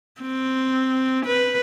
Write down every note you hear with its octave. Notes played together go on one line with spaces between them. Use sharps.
C4
B4